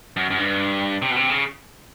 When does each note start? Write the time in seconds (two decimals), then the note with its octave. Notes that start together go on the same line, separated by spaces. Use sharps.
0.17 F#2
0.30 F#2
0.38 G2
1.02 C3
1.11 B2
1.16 C3
1.30 C#3